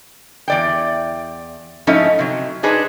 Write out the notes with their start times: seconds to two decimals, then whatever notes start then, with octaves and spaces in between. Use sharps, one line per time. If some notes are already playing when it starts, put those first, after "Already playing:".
0.48 E2 D5 G5
1.87 G#2 F3 A3 C#4 D#4 E4
2.19 C3 F#3
2.63 D4 D#4 G#4 B4 C5